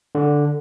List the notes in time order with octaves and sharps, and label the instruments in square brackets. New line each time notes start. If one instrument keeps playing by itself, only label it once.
[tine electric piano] D3